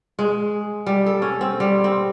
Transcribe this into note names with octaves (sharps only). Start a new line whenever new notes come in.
G#3
G3
A4
C#4
C4
G3
C4